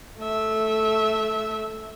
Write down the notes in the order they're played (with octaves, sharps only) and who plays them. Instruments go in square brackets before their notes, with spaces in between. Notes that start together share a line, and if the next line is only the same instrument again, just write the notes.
[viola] A3 E5